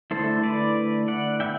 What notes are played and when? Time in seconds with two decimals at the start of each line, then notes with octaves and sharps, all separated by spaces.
0.11 D3 A3 E4 A4 C5
0.43 B4 D5
1.08 D5 F#5
1.40 B3 E4 E5 G5